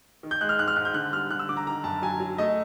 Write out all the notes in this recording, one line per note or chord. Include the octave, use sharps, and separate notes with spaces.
D#3
G6
G#3 F#6
F6
G#2 F#6
F6
G#2 F#6
G6
D3 F#6
G3 F6
D3 F#6
E6
D3 D6
A#5
D#3 A#5
F#2 A5
F#3 G#5
F#3
A3 D#5